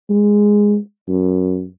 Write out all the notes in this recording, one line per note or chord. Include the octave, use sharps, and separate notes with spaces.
G#3
F#2